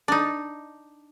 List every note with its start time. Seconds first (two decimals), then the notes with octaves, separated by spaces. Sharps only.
0.08 D4 D#4